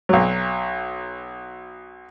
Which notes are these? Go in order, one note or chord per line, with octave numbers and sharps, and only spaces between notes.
B1 F#3